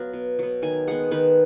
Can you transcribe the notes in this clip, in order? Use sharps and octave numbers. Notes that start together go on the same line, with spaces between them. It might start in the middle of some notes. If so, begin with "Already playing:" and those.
Already playing: F#3 B3 B4 F5
B2
F#3 B3
D#3 G#5
G#3 B3 F#5
D#3 B4